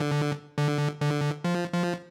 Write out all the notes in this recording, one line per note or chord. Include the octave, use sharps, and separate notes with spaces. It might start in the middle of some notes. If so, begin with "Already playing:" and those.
Already playing: D3
D3
D3
F3
F3